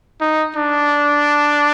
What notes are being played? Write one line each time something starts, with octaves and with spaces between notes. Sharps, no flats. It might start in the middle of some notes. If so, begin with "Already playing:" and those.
D#4
D4